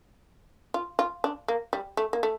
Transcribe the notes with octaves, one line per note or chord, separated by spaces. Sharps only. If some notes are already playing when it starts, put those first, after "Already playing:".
F4
F4
D4
A#3
G3
A3
A#3
A3